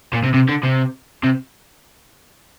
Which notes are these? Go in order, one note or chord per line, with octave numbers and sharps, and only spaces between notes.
A#2
C3
C3
D3
C3
C3